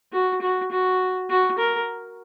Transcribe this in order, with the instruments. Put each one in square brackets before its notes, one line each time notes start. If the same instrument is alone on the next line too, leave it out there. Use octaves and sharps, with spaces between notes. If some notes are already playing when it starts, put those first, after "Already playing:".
[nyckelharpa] F#4
F#4
F#4
F#4
A#4